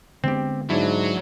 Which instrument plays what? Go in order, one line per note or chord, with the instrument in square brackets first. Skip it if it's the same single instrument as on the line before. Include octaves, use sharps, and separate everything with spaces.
[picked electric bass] D3 G#3 B3 [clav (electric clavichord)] C4 G4
[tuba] G#2 [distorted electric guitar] F#3 [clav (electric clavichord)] D4 E4